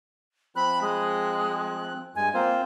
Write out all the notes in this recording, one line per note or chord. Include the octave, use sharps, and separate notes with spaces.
F3 C4 B5 F#6
G#3
G2 G#3 G#5
A#3 C4 F4 C5